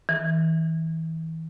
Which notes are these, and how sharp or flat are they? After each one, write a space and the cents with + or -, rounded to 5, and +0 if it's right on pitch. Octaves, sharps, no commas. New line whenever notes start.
E3 -35